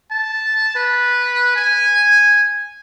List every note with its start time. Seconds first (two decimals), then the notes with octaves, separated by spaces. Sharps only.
0.12 A5
0.76 B4
1.56 G#5